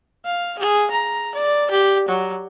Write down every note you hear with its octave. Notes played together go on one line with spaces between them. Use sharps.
F5
G#4
A#5
D5
G4
F#3